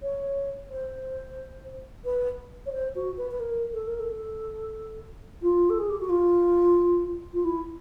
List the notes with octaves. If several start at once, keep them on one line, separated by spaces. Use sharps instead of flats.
C#5
C5
B4
C#5
C5
F#4
B4
B4
A#4
A4
A#4
A4
F4
A4
G#4
G4
F#4
F4
F4
E4